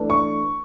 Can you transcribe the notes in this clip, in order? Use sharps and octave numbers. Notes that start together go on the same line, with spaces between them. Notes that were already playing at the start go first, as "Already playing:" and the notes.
Already playing: E3 A3 D4
C#6